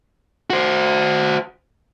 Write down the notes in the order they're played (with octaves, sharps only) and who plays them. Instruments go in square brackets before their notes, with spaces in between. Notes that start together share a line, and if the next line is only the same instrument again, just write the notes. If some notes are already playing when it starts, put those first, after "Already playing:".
[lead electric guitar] F#4 C5